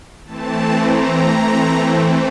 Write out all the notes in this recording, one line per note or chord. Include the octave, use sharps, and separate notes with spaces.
E3 A3 C4 A5
A#5
E3 A3 C4